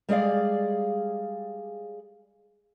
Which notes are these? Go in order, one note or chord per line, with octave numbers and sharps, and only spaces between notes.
G3 G#3 G#4 D5 F5